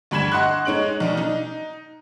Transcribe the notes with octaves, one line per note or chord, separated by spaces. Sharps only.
D2 G2 B5 G#6 E7
D#5 F#5 C6 C#6 F#6
G#3 D#4 C#5 D7 F#7
B1 D4
D#4